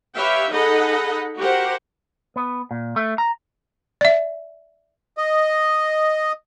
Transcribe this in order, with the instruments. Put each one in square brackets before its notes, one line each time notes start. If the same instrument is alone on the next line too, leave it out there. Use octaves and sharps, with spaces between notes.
[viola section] G4 B4 C#5 E5 F5 G5
D#4 G#4 A4 D#5 F#5 B5
F#4 G4 A#4 C5 F#5
[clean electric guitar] B3
A#2
A3
A#5
[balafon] D5 E5
[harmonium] D#5